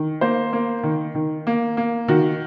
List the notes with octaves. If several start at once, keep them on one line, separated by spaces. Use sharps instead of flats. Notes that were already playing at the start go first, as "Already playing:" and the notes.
Already playing: D#3
A#3 C5
A#3
D#3
D#3
A#3
A#3
D#3 F#4